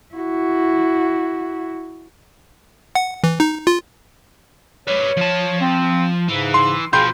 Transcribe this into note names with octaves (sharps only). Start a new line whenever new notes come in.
E4 F#4
F#5
E3
D#4
F4
G4 B4 C#5
F3 A5
C4
G#2 C#3 E3
C6
B2 F3 G#4 F5 G5 B5 C6 G6